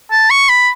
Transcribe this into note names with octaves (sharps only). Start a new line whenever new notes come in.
A5
C#6
B5